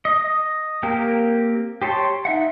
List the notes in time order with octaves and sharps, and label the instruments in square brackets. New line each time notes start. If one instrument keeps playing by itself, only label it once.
[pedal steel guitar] D#5
A#3 C4 G4 A#4
G4 C5 C#5 A5 C6
D#4 E5 F#5